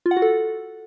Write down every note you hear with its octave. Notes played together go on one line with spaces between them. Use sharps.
F4
F#5
F#4
A4